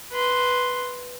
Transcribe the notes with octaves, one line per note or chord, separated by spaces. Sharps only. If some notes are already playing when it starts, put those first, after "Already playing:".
B4 C6